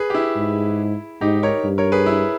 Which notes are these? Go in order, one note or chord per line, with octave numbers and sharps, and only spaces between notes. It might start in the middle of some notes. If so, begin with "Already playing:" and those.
Already playing: G#4 B4
G4
E4
G#2
G#2 D#4 G4
A#4 C#5
G2
A#4 C#5
G#4 B4
E4